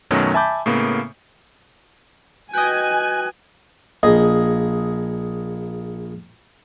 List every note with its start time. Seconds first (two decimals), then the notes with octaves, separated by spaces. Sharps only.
0.11 F#2 B2 D#3 F#3 A3 C#4
0.34 E5 G#5 A5 B5 D6 G6
0.66 A2 C#3 A#3 B3
2.54 F#4 B4 D#5 G5 G#5 F#6
4.03 A#1 G#4 D#5